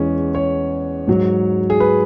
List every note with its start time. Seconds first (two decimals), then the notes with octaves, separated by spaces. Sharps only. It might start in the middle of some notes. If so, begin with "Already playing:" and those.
Already playing: E2 E3 G#3 C#4
0.35 C#5
1.07 G#2 F#3
1.70 G#4
1.80 B4